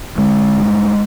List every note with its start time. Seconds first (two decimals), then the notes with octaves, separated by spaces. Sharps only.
0.18 D3 G#3
0.57 G2